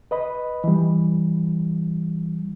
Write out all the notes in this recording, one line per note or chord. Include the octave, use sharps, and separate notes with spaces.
B4 D#5 B5
E3 G3